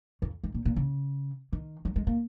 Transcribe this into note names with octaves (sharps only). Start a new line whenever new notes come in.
F2
G#2
A#2
A#2
C#3
D#3
F#3
G#3
A#3